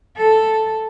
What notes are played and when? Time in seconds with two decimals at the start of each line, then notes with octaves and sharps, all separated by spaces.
0.17 A4